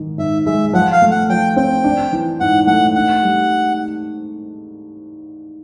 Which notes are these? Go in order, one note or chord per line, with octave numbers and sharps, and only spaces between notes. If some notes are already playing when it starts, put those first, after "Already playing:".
Already playing: G#2 D#3
G#2 E5
G#3 E5
F3 F#5
F5
A3
F#5
F3 G5
C4 G5
D4
E3
G#2 F#5
A3 F#5
D4 F#5
G3